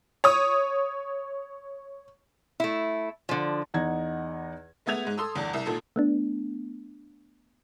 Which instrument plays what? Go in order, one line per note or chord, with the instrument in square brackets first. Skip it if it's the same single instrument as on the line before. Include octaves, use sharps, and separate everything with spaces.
[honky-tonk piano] C#5 D#6
[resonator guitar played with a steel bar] A3 E4
D3 F3
[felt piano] E2 D#4 F#5 A#5 G#6
[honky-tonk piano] G#3 A3 B3 E5 G#6 F7
G#2 G#3
A4 C6 D#6 E6
G1 E2 D4
C2 E5
G#1 A#2 A4
[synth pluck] A3 B3 D4